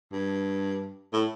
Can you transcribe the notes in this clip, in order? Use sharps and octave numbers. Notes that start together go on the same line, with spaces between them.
G2
A2